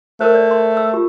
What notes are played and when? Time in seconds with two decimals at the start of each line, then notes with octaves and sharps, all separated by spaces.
0.21 A3 A#4 C5
0.35 D5
0.51 C6
0.77 E6
0.94 F4 G4